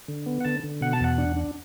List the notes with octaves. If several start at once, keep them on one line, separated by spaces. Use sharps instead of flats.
D3
B3
F#5
D3 A5
D3
B2 F#5
A5
E2 F#5
D4
D4